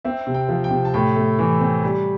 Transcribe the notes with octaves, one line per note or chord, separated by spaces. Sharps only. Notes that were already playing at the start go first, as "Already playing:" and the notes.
C4 E5
C3
G5
F3
G5
C3
A5
A2 G5
A3
E3
C4
G3